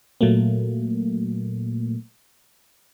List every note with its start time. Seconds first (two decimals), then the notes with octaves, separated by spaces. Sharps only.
0.21 A#2 F#3 A3 A#3